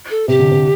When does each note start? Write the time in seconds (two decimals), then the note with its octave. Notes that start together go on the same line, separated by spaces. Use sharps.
0.10 A4
0.28 C3 G4
0.39 D3
0.51 C3